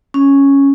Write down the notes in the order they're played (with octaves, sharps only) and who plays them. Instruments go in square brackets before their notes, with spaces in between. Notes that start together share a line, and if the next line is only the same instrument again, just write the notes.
[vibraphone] C#4